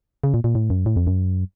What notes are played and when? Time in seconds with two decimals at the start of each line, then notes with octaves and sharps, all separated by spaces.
0.24 C#3
0.34 A#2
0.44 A#2
0.55 A2
0.70 F#2
0.86 A2
0.96 F2
1.07 F#2